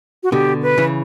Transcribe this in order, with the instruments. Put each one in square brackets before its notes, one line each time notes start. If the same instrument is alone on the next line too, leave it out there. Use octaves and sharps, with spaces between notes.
[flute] F#4
[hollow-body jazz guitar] B2 D3 [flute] G4
[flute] B4
[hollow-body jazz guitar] C#3 E3